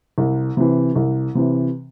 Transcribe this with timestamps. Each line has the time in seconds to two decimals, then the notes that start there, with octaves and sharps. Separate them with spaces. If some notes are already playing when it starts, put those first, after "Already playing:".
0.18 C2
0.57 C3 E3
0.95 C2
1.35 C3 E3